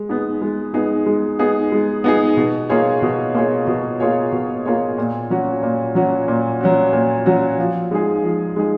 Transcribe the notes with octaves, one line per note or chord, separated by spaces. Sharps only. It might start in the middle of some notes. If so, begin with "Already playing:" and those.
Already playing: G#3
B3 D#4 G#4
G#3
B3 D#4 G#4
G#3
B3 D#4 G#4
G#3
B3 D#4 G#4
B2
A#3 F4 G#4 C#5
B2
A#3 F4 G#4 C#5
B2
A#3 F4 G#4 C#5
B2
A#3 F4 G#4 C#5
A#2
F#3 C#4 F#4
A#2
F#3 C#4 F#4
A#2
F#3 C#4 F#4
A#2
F#3 C#4 F#4
F3
G#3 D#4 G#4
F3
G#3 D#4 G#4